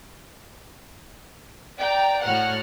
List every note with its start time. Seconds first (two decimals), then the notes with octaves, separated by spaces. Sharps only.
1.79 D5 G5 A#5
2.23 A2 F#4 F#5 F6